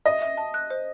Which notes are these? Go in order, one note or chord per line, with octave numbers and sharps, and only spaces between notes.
D#5 E5
E5
A5
F#6
C5